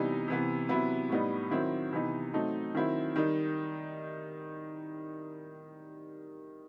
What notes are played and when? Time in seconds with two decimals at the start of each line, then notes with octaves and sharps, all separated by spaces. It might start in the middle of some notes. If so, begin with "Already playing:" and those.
Already playing: C3 E3 G3 B3 D#4
0.28 C3 E3 B3
0.69 C3 F#3 B3 E4
1.10 A2 G3 B3 D#4
1.51 D#3 F#3 C4 E4
1.93 C3 E3 B3 D#4
2.33 F#3 A3 C4 D#4
2.75 D#3 F#3 C4 E4
3.16 D#3 G3 D#4